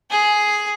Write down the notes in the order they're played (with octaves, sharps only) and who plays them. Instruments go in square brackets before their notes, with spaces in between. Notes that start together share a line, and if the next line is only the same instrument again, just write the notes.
[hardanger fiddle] G#4